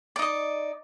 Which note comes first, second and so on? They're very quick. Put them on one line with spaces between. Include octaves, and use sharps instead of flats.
D5 D#4 D#5